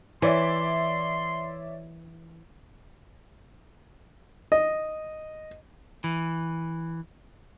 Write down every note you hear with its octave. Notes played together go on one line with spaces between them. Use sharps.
E3 C#5 D5 E5 C6
D#5
E3